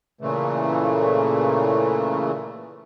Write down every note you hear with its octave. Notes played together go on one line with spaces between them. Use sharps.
A#2 C#3 E3 A3